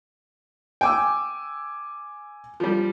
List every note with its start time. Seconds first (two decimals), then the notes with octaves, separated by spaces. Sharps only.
0.81 G5 G#5 D6 E6
2.60 F3 G3